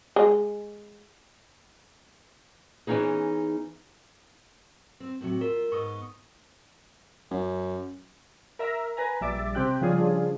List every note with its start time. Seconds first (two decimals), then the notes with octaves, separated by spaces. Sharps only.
0.16 G#3
2.87 E3 B3 C#4 D#4 G#4
5.00 C4
5.21 A2 C3 F#3
5.41 F4 A#4
5.72 G#2 B3 D#5 C#6 D#6
7.31 F#2
8.59 A#4 E5 A#5
8.97 B4 G#5 A#5
9.21 A#1 G3 E5 D6 A6
9.55 C3 C4 G4 G5 F#6
9.81 C#3 F3 G3 D4 F4 G#4